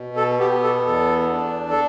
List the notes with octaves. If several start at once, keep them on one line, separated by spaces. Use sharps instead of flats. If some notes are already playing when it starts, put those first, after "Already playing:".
Already playing: B2
A4
B3 G4
A4
E2 A4
D4
A4